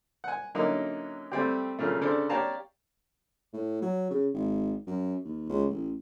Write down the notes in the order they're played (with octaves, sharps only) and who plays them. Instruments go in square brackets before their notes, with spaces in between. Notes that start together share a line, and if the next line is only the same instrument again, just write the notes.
[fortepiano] F#5 G#5
D3 F#3 A#3 C#4 D#4 E4
G3 A3 C4 G4
A#2 C#3 F#3 A3
C#3 D4 A4 C5 D5
G4 C#5 D5 F5 A5 A#5
[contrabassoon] A2
F#3
C#3
G#1
F#2
D#2
C#2
A1